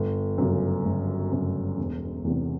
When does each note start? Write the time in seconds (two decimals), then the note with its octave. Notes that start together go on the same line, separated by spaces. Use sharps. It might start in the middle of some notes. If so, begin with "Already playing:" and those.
Already playing: G1
0.38 F#2 C#3
0.85 G1
1.32 F#2 C#3
1.78 E1
2.25 E2 C3